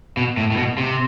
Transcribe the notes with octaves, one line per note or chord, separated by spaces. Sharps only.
B2
A2
A2
B2
C3